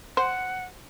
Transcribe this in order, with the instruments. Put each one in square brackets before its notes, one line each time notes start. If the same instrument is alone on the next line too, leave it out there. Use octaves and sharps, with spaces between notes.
[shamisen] C5 [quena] F#5